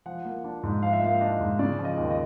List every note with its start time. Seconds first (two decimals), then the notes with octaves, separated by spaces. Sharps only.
0.06 F3 F#5
0.25 A#3
0.44 D4
0.63 G#2
0.82 F3 F5
0.93 E5
1.02 A#3 F5
1.21 D4 D#5
1.41 G#2
1.59 C#3 D5
1.79 F3
1.85 D#5
1.97 D#2
2.10 D#5